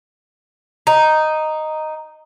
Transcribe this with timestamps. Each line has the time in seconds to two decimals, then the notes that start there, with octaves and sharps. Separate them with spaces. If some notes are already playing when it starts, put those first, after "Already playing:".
0.87 D#4